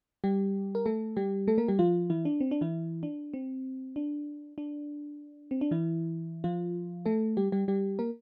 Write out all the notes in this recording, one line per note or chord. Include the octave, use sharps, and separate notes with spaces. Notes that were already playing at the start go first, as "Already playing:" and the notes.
G3 G4
A#4
A3 A4
G3 G4
A3 A4
A#3 A#4
G3 G4
F3 F4
E3 E4
D4
C4
D4
E3 E4
D4
C4
D4
D4
C4
D4
E3 E4
F3 F4
A3 A4
G3 G4
G3 G4
G3 G4
A#3 A#4